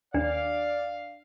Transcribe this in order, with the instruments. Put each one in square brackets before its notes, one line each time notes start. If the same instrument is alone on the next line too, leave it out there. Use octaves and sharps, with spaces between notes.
[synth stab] D#2 [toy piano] D4 [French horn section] D5 [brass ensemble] F5